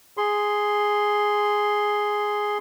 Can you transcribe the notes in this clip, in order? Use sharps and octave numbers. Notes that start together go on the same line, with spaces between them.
G#4 C6